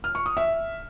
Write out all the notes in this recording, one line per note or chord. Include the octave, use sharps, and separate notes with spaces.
F6
C#6
D#6
E5